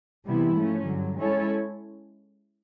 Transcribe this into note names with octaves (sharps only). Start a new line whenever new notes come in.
C3 E3 G3 B3 E4
G#2 F3 A3 C#4
G2 D3 F#3
G#3 C#4 E4 A4 C#5